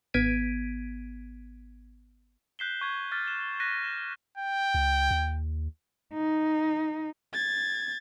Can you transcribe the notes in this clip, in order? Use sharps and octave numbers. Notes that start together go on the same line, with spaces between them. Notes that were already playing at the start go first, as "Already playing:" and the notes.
G#1 B3 G#6 B6 D7 D#7
F#6 G6 B6 C7 E7 G7
C#6 G#6
D6 F6 F#6 A6 B6
F#6 A6 E7
F#6 A#6 B6 D#7
E7
G5
C#2
D#2
D#4
G#6 A6